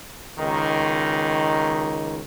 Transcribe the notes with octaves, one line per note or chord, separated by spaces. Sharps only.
C#2 D#3